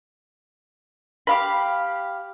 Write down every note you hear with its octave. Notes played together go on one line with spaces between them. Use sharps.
G4 F5 B5